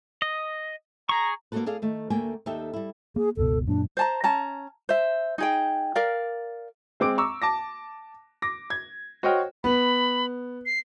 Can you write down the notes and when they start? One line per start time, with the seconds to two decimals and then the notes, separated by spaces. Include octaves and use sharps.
0.22 D#5
1.09 G#4 A#5 C#6
1.52 A#3 B3 D#4 F#4 A4 B4
1.66 G#4 A4 D5 F5
1.82 D#3 A3
2.10 D2 A3 A#3 G5 G#5
2.46 D#2 D#4 G4 A4 E5 G5
2.73 G3 E4
3.16 A#3 G#4
3.37 F#1 C#2 B2 A4
3.68 F#2 A#2 D4
3.97 C5 A5 A#5
4.24 C#4 A5 A#5
4.89 C5 E5
5.38 D#4 G#4 G5
5.95 A#4 D5 F5
7.00 G#3 C4 D6 D7
7.18 A#5 C#6 D6 E6
7.42 A5 D6 A#6
8.42 D6 A#6
8.70 G#6
9.23 F#4 C5 C#5 D#5 G5 F6
9.64 B3 B5
10.66 C7